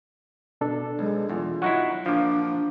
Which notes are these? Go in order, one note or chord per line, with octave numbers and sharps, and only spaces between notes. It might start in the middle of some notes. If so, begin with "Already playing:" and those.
B2 D4 A4
B1 G#3
E2 F4
F#3 D#4 E4 F#5 C#6 F#6
A#2 F3 D4 F5 D6